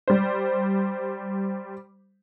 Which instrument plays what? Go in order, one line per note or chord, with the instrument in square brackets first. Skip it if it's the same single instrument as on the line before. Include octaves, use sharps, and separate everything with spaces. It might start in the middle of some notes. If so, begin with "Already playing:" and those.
[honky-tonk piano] G3 C5